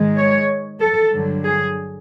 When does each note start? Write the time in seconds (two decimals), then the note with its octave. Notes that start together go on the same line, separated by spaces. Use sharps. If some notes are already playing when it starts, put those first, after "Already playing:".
Already playing: G#2 D#3 G#3
0.17 C#5
0.80 A4
1.12 G2 D3 F#3
1.44 G#4